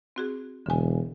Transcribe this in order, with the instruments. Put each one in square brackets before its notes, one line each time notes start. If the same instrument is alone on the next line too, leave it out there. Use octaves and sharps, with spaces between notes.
[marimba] C4 F#4 G#4
[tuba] E1 [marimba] D3 G#5